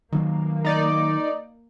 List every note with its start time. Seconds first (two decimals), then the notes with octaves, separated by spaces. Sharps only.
0.12 D#3 F#3 A#3
0.65 D#4 D5